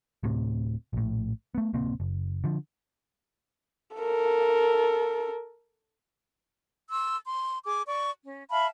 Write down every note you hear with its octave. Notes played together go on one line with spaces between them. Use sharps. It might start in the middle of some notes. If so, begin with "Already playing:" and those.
D1 A2 C3
A#1 A2
A3 B3
D1 C3 A#3 C4
F#1
D3 F3
A4 A#4
C6 E6
C6
G#4 D6
D5 C#6
C#4
E5 F5 A5 B5